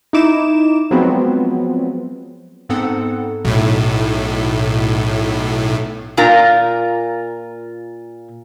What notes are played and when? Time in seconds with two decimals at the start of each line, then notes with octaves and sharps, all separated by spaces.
0.13 D#4 E4 D6 E7
0.91 F3 F#3 G#3 B3 C4
2.69 G#2 B3 C4 A4 F#5
3.45 B1 A2
6.17 A#2 F4 A#4 A#5